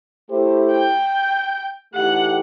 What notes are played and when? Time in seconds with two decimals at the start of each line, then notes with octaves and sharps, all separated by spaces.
0.30 A3 E4 G4 C5
0.71 G5
1.94 A2 E3 A3 D#4 G4 F#5